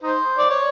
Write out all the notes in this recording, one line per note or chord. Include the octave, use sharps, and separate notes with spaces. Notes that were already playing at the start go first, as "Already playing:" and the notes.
D#4 C5
D5
C#5